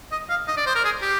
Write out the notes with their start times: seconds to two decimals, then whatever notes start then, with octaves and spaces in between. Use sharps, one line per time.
0.12 D#5
0.29 F5
0.48 D#5
0.57 D5
0.67 C5
0.75 A#4
0.84 G#4
1.02 G4